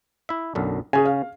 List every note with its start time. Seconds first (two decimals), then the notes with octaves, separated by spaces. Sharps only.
0.29 E4 E5
0.55 B1 F#2 D3
0.93 C#3 C#4 G#4 G#5
1.05 F5